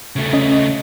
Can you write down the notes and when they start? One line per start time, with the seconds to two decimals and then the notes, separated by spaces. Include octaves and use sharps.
0.16 C#3 A3
0.33 C#4 D#5